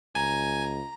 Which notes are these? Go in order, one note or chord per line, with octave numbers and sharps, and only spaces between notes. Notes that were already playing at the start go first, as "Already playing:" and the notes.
C#2 G#5 A#5